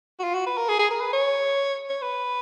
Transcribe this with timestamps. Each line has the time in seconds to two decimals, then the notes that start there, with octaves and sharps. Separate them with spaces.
0.20 F#4
0.24 F4
0.35 F#4
0.46 B4
0.57 A#4
0.69 G#4
0.79 G#4
0.90 A#4
1.01 B4
1.13 C#5
1.90 C#5
2.02 B4